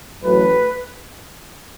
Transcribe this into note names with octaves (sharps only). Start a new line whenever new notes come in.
A1 A2 F#3 B4